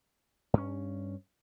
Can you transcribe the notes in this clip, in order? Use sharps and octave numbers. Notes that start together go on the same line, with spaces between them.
G2 C#4